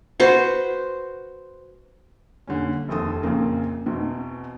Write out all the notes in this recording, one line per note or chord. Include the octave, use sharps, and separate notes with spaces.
F#4 B4 C5
A#2 D3 G3 C#4
F1 A#1 D#2 C4 A4 D#6
A#1 F2 A#2 C#3 A#3
E2 B2 C4